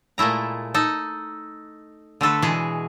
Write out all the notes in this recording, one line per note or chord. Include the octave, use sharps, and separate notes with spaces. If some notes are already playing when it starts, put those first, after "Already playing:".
A#2 G#3 A3 E4 A#5
D#4 A4
D3 A3 A4 B4
B2 E3 G#3 G#4